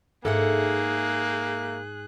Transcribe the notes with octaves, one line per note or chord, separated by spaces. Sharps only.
G#2 A#3 G#4 A4 E5 F#5 F#6